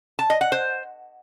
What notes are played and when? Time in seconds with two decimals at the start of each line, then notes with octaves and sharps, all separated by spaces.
0.19 A5
0.30 D#5
0.41 F#5
0.52 C5